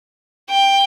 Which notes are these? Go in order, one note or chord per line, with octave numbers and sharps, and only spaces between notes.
G5